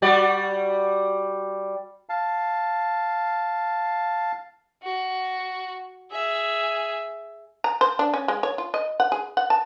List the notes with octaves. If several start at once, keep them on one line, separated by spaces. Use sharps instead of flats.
G3 F#4 D5
F5 A5
F#4
G#4 E5
A#5
C5
D4
C#4
G#3
C#5
F4
D#5
F#5
G#4
F#5
A5